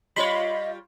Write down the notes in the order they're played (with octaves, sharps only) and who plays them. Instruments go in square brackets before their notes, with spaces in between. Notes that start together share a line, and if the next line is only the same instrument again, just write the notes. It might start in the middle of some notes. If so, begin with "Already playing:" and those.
[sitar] G3 F4 C#5 [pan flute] D#5 [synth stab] B5 C6